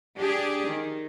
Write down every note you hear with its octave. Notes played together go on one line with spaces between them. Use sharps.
D4 G4 G#4
D#3